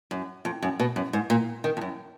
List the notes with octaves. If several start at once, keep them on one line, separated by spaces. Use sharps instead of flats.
F#2
F2
F#2
B2
F#2
G#2
A#2
D#3
F2
F#2